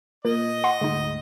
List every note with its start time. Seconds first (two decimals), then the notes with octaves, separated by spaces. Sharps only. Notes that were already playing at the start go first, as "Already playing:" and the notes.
0.25 A#2 A#4 D#5
0.64 F#5 C6 C#6
0.81 D2 G#2 G#3 D#4